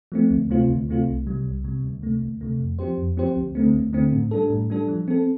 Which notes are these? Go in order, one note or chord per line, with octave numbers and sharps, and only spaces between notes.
F3 A3 C4
D2
C3 A3 C4 F4
D2
C3 A3 C4 F4
C2
C3 G3
C2
C3 G3
D2
C3 A3
D2
C3 A3
F2
F3 C4 G4 C5
F2
F3 C4 G4 C5
D2
D3 A3 C4
D2
D3 A3 C4
A2
G3 D4 A4
A2
G3 D4 A4
F3
C4 A4